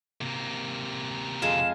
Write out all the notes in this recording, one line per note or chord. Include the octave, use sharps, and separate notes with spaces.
C3 A#3
F2 G#3 F4 E7